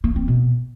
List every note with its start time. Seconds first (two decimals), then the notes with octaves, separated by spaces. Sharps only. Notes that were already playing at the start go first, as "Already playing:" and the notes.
0.04 A#3
0.16 C4
0.28 B2